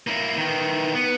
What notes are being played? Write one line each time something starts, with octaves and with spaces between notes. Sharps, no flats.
A#3 E4
D#3 E3
B3